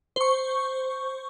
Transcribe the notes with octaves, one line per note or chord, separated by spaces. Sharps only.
C5 C#6